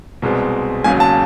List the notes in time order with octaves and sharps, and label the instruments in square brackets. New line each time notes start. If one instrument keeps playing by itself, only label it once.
[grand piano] C2 B2 G#3 C4
E1 D#2 C#3 F#3 G#5
A5